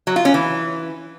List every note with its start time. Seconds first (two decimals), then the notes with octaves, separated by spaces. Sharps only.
0.07 F#3
0.16 F4
0.25 C#4
0.34 E3